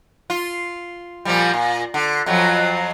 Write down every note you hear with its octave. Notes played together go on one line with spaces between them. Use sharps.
F4
A#2 F3 G3
A#2
D3
F2 F3 F#3